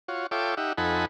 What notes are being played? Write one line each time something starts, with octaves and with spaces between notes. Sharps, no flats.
F4 F#4 C#5
F4 A4 C#5 E5 G5 D6
D#4 G4 E5 F#5
F2 D#4 A4 F#5 G#5 B5